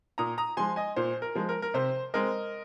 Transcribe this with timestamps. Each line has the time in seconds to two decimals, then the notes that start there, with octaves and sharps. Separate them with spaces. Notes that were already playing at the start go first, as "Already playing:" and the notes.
0.18 A#2 A#5 D#6
0.38 A#5 D#6
0.57 F3 G#3 G#5 C6
0.76 D#5 G#5
0.96 A#2 C5
1.22 A#4
1.35 F3 G#3
1.49 A#4
1.62 A#4
1.74 C3 C5
2.14 G#3 C4 A#4 D#5